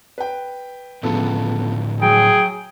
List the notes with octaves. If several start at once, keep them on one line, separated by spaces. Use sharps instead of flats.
B4 G5
C#2 A2 D3 F3 B3 A4
F#3 G#4 G5